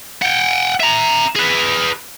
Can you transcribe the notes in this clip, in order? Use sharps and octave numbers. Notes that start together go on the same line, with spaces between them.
F#5 G5
E5 A#5
G#4 B4